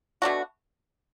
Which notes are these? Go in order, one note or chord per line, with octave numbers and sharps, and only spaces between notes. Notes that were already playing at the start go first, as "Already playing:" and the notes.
B2 A3 D4 F#4